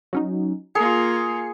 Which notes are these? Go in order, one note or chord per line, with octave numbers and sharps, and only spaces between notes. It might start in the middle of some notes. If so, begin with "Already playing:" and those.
F#3 C#4 D#4
A#3 F4 G#4 C7 C#7